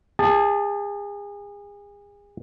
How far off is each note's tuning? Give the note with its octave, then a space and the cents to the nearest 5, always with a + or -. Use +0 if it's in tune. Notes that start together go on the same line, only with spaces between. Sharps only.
G#4 -35 A5 +0